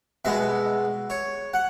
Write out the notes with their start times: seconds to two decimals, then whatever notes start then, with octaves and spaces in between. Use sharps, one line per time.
0.25 B2 G#3 B3 E5
1.10 C#5
1.54 F#5